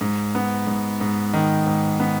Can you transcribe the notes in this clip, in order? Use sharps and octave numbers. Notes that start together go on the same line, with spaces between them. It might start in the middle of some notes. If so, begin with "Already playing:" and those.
G#2
B3
G#2
G#2
D#3
G#2
B3